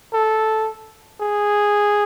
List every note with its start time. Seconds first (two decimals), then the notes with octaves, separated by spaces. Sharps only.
0.13 A4
1.21 G#4